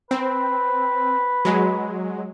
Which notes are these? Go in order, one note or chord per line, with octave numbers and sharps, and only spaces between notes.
C4 B4
F#3 G#3